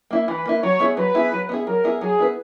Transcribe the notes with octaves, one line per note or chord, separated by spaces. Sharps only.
A#3 E4
E3 B4
A#3 E4
F#3 C#5
B3 E4 G#4
F#3 B4
B3 E4 G#4
F#3
B3 E4 G#4
F#3 A#4
B3 E4 G#4
F#3 G#4
B3 E4 B4